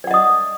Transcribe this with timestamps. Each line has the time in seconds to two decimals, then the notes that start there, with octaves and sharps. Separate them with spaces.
0.04 D5
0.07 F#5
0.11 D#5
0.14 D#6